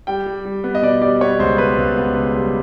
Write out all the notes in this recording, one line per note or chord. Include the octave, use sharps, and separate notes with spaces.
G3 G5
G3
G3
B3
D#5
B2 D5
G3 D5
B3 C#5
C#2 C5
B3 B4
C#2
B3
C#2
G3